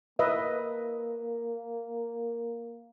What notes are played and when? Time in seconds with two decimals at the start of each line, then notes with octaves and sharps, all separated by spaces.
0.19 A#3 B4 D#5 E5